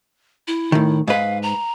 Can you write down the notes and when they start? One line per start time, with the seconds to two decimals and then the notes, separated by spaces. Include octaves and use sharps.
0.48 E4
0.72 A2 D#3
1.07 G#2 B4 F5
1.43 A#5